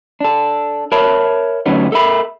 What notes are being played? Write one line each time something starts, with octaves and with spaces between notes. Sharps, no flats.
D4 A4
A#4 C#5 E5 A5 B5
D3 F#3 A3 B3 C#4 D#4
A4 A#4 E5 B5